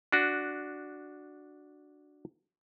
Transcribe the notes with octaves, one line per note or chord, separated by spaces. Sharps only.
D4 F#4